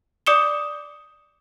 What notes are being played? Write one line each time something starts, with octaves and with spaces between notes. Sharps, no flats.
D5 D6 D#6 C#7 E7 G7